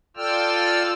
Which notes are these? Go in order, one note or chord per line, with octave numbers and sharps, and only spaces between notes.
F4 A4 D5 G5 E6 F6